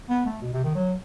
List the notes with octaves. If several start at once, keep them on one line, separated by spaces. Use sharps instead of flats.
B3
A3
B2
C3
D#3
F#3